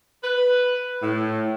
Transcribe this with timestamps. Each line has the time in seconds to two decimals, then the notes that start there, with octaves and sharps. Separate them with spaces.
0.24 B4
1.03 A2